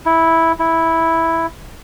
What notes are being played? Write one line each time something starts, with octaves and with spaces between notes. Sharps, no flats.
E4
E4